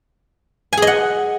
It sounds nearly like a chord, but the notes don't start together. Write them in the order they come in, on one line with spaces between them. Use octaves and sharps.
G#5 G#4 D#5 F#5